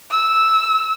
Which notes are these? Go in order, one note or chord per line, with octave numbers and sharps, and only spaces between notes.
E6